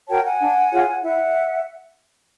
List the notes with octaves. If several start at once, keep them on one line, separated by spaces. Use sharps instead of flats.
F#4 A#4 C#5 G5 A5
F#5 G#5
D4
F4 G#4 C#5
E4 E5 F#5